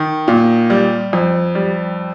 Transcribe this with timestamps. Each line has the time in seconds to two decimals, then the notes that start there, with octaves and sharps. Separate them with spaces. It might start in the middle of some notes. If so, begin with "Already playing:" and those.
Already playing: D#3
0.28 A#2
0.70 G3
1.13 F2
1.55 G3